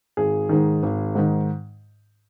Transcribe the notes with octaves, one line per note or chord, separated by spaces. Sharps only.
G#1 G#4
G#2 D#3
G#1
G#2 D#3